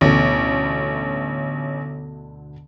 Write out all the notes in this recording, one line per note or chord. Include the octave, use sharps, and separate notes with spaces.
A1 D2 B2 D3